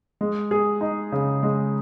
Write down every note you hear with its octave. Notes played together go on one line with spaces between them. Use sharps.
G#3
G#4
D#4
C#3
G#3